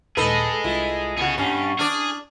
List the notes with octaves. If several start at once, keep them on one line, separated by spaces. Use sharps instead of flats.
D#2 A#2 D#4 G#4 A4 B4 D#5
C2 E4 F4 A6
B2 F#4 G#4 C#5
G2 C#4 G#5 B5
D4 G#4 D5 F6